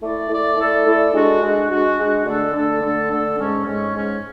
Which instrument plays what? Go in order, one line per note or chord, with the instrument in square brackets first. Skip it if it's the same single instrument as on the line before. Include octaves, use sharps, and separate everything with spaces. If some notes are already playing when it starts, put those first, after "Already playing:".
[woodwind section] A3 E4 A4 D5
A3 E4 A4 D5
A3 E4 A4 D5
A3 E4 A4 D5
G#3 D4 F#4
G#3 D4 F#4
G#3 D4 F#4
G#3 D4 F#4
D3 A3 D4 A4
D3 A3 D4 A4
D3 A3 D4 A4
D3 A3 D4 A4
G#2 G#3 C#4
G#2 G#3 C#4
G#2 G#3 C#4